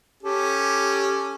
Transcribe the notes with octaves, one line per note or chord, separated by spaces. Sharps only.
C#4 G4 A4